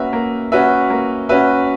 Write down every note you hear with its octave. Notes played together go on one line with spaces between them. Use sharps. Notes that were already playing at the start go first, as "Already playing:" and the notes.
Already playing: A#3 C#4 F#4 B4 E5
A#3
C#4 F#4 B4 E5
A#3
C#4 F#4 B4 E5